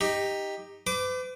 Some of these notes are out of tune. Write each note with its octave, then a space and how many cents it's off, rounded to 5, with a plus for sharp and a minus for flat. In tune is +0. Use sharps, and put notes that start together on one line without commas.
D#4 +0 G4 +10
B4 +45 D6 +0